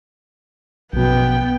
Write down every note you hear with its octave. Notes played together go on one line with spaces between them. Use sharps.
A#1 F#2 B2 B3 G5